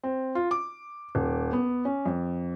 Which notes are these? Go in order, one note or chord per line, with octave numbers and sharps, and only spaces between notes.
C4
F4
D6
D#1
B3
C#4
F2